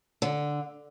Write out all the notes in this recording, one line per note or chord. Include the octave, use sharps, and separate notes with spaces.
D3